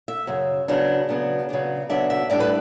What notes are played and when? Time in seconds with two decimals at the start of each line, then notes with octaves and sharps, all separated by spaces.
0.08 E5
0.27 F#2 C#3
0.68 C#3 F#3 B3 D4
1.09 C#3 F#3 B3 D4
1.49 C#3 F#3 B3 D4
1.90 C#3 F#3 B3 D4 E5
2.10 E5
2.30 A2 G3 D4 D5
2.40 B4